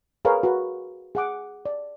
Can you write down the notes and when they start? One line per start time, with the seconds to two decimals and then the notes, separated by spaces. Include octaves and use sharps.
0.25 G#4 A#4 B4 C#5 F5
0.43 F#4 B4
1.15 G#4 F#5 D6
1.66 D5